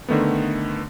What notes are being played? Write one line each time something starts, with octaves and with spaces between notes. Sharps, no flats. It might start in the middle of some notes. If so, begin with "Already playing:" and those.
D3 D#3 A3 B3